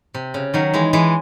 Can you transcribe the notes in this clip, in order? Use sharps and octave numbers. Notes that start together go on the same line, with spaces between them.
C3
C#3
D#3 F#3
E3 G#3
E3 G#3